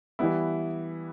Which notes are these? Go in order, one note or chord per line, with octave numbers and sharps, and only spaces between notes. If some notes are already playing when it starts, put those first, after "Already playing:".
E3 G3 B3 E4